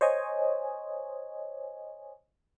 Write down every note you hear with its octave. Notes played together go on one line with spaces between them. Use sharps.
C5 C#5 D#5 G#5